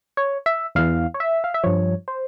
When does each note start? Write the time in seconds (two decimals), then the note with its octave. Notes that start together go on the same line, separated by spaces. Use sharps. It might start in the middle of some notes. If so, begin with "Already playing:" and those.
0.17 C#5
0.46 E5
0.75 E2 E3 F5
1.14 C#5
1.20 E5
1.44 F5
1.54 E5
1.64 G2 F3 C#5
2.08 C5